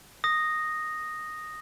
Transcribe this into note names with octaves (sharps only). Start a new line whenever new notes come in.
D#6 A#6